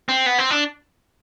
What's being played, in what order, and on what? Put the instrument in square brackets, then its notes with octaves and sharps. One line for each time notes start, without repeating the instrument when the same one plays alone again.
[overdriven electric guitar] C4
B3
C4
D4